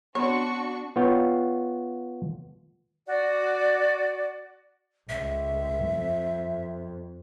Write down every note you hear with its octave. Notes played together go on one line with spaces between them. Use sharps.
B3 C4 D4 F#4 C#5 C#6
B3 F4 C#5 G5
F#4 D5
C#2 E5
F2